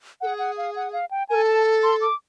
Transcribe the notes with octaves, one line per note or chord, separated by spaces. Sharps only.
G#4 A4 F#5
F#5
F5
F#5
F5
G5
A4 A#4 G#5
A5
C6
D6